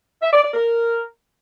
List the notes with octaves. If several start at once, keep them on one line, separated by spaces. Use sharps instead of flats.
E5
D5
D5
A#4